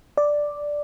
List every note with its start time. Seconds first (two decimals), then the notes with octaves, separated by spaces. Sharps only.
0.17 D5